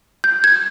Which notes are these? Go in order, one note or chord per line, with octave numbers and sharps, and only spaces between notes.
G6
G#6